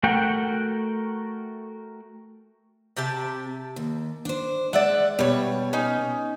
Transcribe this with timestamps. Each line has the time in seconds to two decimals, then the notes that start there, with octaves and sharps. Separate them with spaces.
0.03 A3 F#4 A#4 F#5 G5
2.97 C3 G4 E5 A5
3.76 D#2
4.25 D4 C5
4.73 G#3 D5 E5 F#5
5.19 B2 G3 C#5
5.73 C#4 D#4